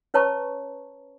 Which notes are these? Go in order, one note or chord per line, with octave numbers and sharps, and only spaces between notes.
C#4 B4 C#5 A5 A#5 C#6